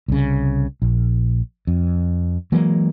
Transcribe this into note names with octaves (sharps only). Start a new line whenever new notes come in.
C2 C#3
A#1
F2
E3 F#3 G#3 A#3